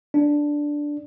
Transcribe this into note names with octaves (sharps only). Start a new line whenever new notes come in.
D4